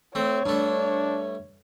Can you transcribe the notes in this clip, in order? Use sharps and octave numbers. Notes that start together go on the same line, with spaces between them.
A3 C4 C#5
G2 A3 D4